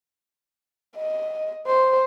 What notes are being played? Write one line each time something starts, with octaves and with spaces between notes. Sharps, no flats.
D#5
C5